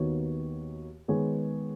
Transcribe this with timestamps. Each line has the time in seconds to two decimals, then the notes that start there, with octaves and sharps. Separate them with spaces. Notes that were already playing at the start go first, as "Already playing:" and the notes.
Already playing: D#2 D#3 B3 F#4 C#5
1.08 D#3 G#3 B3 G#4 C#5